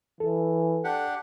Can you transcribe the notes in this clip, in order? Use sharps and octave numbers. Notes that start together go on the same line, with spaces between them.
E3 A4
D4 G4 F#5